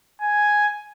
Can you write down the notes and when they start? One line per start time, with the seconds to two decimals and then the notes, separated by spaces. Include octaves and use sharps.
0.22 G#5